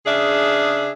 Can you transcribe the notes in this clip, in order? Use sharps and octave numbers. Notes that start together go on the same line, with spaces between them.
C#3 D4 G#4 E5